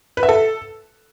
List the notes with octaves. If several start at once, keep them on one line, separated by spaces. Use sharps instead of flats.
B4
E5
A4